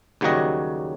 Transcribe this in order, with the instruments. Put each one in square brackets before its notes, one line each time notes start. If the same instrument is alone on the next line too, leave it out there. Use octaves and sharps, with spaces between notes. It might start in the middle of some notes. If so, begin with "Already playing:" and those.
[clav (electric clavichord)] D#2 C#3 F#3 G3 F#4 D#5